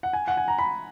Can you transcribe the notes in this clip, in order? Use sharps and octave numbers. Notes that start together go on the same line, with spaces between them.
F#5
G#5
F#5
G#5
A#5
B5